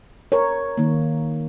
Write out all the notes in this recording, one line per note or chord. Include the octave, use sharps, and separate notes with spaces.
A#4 C#5
D#3 A#3